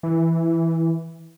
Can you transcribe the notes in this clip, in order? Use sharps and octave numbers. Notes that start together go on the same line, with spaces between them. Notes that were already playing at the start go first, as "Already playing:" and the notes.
E3